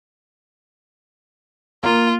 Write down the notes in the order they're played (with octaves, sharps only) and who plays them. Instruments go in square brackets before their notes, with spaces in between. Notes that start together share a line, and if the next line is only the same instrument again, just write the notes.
[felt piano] A#3 [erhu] F4